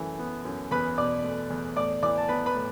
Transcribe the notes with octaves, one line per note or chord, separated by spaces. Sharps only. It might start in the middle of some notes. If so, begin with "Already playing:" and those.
Already playing: F#2 E3 A3
B3
F#2
E2 B4 B5
B2 D5 D6
A3
E2
A2 D5 D6
E3 D5 D6
A5
B3 B4 B5
B4 B5
A2